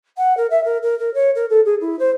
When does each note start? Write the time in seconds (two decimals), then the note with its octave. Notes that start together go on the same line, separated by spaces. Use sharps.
0.17 F#5
0.37 A#4
0.50 E5
0.64 A#4
0.82 A#4
0.99 A#4
1.14 C#5
1.35 A#4
1.49 A4
1.65 G#4
1.80 E4
1.99 C5